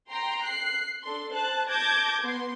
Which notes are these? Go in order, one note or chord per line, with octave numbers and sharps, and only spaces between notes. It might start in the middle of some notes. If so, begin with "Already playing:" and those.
G5 A#5 C6
F#6 C7
D4 A4 C6
C5 A5 F#6
A5 D6 G6 G#6 A#6
B3 C6